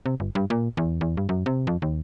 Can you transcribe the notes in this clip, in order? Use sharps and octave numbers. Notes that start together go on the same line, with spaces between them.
C3
G1
G2
A#2
E2
E2
G2
F#2
C3
F2
D#2